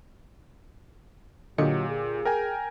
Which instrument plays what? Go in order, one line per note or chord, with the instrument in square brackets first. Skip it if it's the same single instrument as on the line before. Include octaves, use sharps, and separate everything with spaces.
[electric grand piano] A#2 G4 [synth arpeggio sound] D3 D#5 C#7 [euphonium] F#3
[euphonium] G#4
[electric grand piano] A#4 G5 G#5